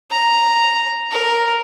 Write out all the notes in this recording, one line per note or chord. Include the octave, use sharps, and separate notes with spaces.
A#5
A#4